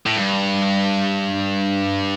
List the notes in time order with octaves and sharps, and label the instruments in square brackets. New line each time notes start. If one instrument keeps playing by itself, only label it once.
[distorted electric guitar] A2
G2